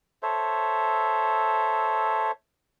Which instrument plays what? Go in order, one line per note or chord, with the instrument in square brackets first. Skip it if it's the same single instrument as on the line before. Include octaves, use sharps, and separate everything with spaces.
[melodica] A4 C5 C#5 E5